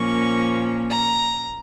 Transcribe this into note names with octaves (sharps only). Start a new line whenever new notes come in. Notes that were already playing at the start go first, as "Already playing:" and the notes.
Already playing: A#2 F3 A#3 C#4 C#6
A#5